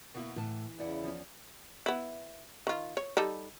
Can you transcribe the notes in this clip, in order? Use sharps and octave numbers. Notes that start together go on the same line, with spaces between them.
B2 A#3 E4
A2 E3 F#5 A5
E2 C#3 E4 D5 F#5
F3 C#4
B3 E4
D#3 F4
C#5
G3 D#4 A4